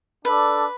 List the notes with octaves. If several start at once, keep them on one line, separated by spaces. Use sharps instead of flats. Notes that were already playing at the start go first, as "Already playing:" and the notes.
D4 A4 B4 D5